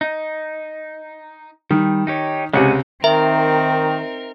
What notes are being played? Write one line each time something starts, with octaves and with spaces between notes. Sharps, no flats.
D#4
D#3 G3
D#4 G4 C#5
C#2 C3 G#3 F#5 G#5
D#3 C4 D#4 A#4 E5